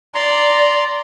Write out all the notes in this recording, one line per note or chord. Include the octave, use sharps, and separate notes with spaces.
D5 A#5 C6